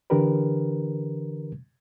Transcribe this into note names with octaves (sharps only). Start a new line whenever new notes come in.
D3 E3 D4 G4 A#4 B4